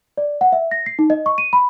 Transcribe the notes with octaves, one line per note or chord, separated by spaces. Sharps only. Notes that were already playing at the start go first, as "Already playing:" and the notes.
D5
F#5
E5
A#6
C7
D#4
D#5
C#6
D#7
B5